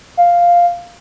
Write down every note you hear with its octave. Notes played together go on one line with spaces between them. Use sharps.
F5